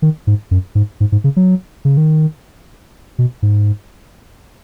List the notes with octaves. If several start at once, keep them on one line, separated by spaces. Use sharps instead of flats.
D#3
G#2
F#2
G#2
G#2
G#2
C#3
F#3
C#3
D#3
B2
G#2